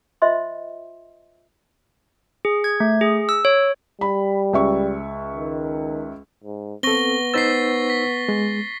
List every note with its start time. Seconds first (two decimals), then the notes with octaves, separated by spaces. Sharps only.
0.22 F4 C5 D#5 E5 C6
2.45 G#4
2.64 G#6
2.80 A3
3.01 G#4
3.29 E6
3.45 C#5
4.01 G3 B5
4.53 C#2 E5 C#6
5.34 D#3
6.44 G#2
6.83 B3 C4 A4 C#6 A#6 G7
7.34 D#4 C5 E6 A6 B6 C7
7.90 B6
8.29 G#3